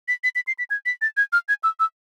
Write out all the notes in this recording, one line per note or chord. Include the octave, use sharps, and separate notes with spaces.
B6
B6
B6
C7
B6
G#6
B6
A6
G#6
F6
G#6
E6
E6